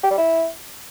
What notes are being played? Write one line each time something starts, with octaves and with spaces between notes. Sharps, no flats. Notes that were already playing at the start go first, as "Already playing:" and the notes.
G4
G3
E4